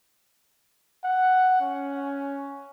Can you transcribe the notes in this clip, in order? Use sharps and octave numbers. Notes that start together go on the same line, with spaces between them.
F#5
C#4